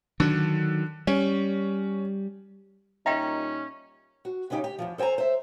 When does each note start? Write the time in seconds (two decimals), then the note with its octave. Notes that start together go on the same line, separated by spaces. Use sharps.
0.20 D3 D#3 F#3
1.07 G3 C#4
3.06 A#2 G3 C#4 D#4 D#5 E5 G5 A#5
4.25 F#4
4.50 C#3 B3 C#4 D#4 G4
4.64 G4
4.78 E2 D#3 F3
4.98 A4 C5 G5 G#5 A#5
5.18 C5 E5